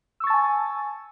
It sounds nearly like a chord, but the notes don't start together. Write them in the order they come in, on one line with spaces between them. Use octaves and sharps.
E6 C#6 A6 A5 G#5